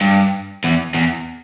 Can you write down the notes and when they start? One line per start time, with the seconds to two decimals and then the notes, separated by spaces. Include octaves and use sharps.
0.01 G2
0.64 E2
0.94 E2